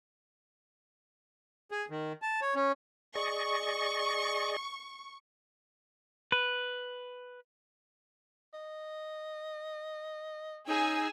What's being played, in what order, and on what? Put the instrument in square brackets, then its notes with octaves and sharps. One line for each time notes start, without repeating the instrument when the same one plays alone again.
[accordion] G#4
D#3
A5
C#5
C#4
[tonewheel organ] G#4 D5 D#5 [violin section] C#6
[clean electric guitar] B4
[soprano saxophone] D#5
[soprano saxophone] C#4 [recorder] D#4 [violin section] G#4 G#5 E6